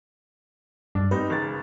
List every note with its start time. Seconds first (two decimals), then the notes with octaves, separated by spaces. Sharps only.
0.95 G2 D4
1.11 G3 C4 D#4 B4
1.30 G#1 C#3 A6